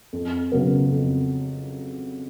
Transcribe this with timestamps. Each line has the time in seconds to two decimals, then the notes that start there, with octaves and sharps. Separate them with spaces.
0.13 F2
0.52 C#3 F#3 B3
0.90 F2